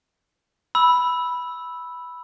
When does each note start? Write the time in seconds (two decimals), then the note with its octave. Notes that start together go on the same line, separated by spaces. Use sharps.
0.75 B5 E6